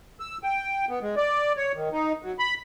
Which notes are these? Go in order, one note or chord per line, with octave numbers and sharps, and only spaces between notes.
E6
G5
B3
G#3
D5
C#5
D#3
D#4
F#3
B5